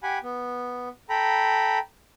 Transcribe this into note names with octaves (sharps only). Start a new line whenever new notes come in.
G4 F#5 G#5 B5
B3
A4 G5 A#5 B5